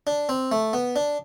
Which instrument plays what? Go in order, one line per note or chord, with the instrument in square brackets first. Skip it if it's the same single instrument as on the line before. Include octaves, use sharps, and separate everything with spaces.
[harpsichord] D4
C4
A3
B3
D4